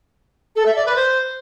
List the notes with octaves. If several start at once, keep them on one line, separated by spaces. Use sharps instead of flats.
A4
E5
D5
B4
C5